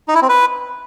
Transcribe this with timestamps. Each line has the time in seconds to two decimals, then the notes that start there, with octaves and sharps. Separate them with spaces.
0.08 D#4
0.15 E4
0.22 C4
0.29 B4